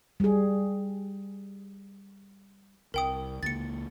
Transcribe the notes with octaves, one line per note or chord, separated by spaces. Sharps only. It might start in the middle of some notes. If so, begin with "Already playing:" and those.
G3 G#4
C2 A#4 G5 D#6
C#2 A#3 A6 C#7